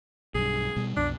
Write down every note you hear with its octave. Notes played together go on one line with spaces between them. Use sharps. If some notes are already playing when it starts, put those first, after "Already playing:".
B1 G2 G#4
B2 G3
B1 F2 B2 D4